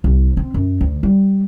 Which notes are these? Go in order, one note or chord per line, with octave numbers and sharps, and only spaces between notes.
C2
C4
F#2
D2
G3